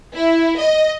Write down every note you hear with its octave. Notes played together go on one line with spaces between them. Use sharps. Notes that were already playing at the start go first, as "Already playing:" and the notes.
E4
D#5